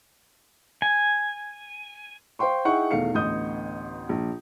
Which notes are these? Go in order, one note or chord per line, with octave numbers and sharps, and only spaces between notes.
G#5
C5 F5 G5 C6 C#6
D#4 E4 G#4 F#5 G5 C#6
E2 B2 D#3 A3 F5 C#7
A1 D2 B3 D#5 D#6 G6
A#1